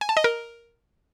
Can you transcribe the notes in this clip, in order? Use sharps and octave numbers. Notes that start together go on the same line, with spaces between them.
G#5
A5
D#5
A#4